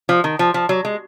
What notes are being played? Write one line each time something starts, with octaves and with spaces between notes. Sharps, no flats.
F3
D#3
F3
F3
F#3
G#3